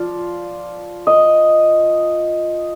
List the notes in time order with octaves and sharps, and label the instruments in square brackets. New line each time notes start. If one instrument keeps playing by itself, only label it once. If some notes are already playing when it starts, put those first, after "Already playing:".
Already playing: [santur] F3 F4 D5
D#5